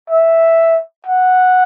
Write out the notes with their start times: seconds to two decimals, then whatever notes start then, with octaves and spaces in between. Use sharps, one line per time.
0.10 E5
1.06 F#5